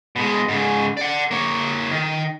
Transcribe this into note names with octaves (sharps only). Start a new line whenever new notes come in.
B2 G#3
G#2 C#3
D5 F#5
A#3 C#5
D#3